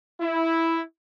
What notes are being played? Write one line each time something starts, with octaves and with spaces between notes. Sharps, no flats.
E4